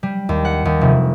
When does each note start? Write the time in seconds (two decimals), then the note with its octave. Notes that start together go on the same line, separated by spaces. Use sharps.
0.03 G3
0.29 D#2
0.45 F#5
0.65 D#2
0.81 F1